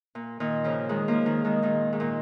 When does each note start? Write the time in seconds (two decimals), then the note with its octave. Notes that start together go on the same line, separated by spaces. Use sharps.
0.15 A#2
0.40 A#2 D#3
0.64 C#3 F3
0.89 D#3 G#3
1.08 F3 A#3
1.26 D#3 G#3
1.45 D#3 G#3
1.62 A#2 D#3
1.93 G#2
2.00 A#2